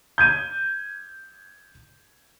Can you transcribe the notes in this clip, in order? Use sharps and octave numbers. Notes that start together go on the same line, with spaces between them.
G6 G#6 D#7